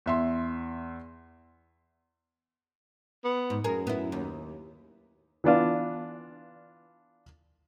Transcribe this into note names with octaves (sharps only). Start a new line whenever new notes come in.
E2 E5 C6
B3
G#2
F#2 G#4 A#4
B3 E4
D#2
E3 B3 D4 F4